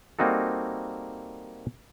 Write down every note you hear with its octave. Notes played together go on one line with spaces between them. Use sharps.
G3 A#3 C4 D#4 F#4 A4